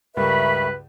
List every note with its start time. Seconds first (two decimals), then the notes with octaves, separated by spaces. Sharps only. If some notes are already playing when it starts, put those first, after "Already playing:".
0.17 C#2 G2 G3 A#4 B4 E5 B5 C#6